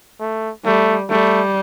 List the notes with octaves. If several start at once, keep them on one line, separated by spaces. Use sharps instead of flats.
A3
G3 A3
G3 A3